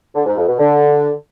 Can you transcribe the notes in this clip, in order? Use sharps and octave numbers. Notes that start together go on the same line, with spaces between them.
D3
G#2
F2
B2
D3